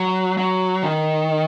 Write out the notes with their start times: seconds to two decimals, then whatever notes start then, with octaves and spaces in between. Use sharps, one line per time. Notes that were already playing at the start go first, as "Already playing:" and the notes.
Already playing: F#3
0.37 F#3
0.82 D#3